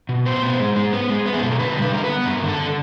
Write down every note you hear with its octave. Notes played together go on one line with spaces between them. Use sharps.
B2
B3 C5
B3
G#3
G#3
B3
G#3
B3
G#4
B2 A4
A#4
D3 B4
G3
B4
D3 A#4
B4
B3
G2 A#4
D3
A4
D3